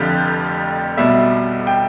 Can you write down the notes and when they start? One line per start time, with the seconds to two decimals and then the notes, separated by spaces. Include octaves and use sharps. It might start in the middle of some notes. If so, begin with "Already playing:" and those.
Already playing: F1 F2 D3 F3 G4
0.97 B1 B2 G3 E5
1.67 G5